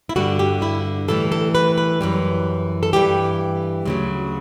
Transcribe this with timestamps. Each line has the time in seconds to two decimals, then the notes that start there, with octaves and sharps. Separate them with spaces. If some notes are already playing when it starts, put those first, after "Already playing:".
0.09 E4
0.16 G2 D3 G3 F#4
0.39 G4
0.62 E4
1.08 A2 E3 G3 A4
1.32 A4
1.55 B4
1.78 B4
2.01 F#2 E3 G3
2.83 A4
2.93 G2 E3 G3 G4
3.85 D2 C#3 F#3